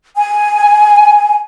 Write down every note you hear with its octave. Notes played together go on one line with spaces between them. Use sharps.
G#5